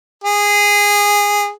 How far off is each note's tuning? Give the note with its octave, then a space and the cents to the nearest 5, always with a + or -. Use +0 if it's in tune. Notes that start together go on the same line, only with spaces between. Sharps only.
G#4 -15